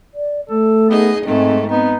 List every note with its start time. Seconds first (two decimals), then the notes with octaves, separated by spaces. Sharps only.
0.14 D5
0.50 A3 A4
0.90 B3 D#4 G#4 D#5
1.26 G#2 D#3 G#3 A3 C4
1.69 B3 C4 D#4